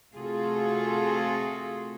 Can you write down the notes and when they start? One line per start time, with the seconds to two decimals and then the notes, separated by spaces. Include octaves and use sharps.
0.13 C3 A3 F4 F#4 G#4 A4